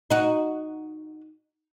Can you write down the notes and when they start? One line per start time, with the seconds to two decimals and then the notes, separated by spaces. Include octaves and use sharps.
0.10 D#4 F#4